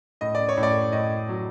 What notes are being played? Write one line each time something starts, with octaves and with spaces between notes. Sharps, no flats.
A2 D#5
D5
C#5
A2
D5
A2 D#5
F#3